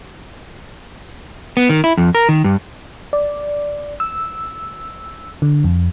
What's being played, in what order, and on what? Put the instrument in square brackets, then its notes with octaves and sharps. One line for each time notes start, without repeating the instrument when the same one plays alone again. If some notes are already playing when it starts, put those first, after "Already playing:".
[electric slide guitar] B3
D#3
E4
F2
A#4
D#3
G2
[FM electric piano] D5
E6
D3
F2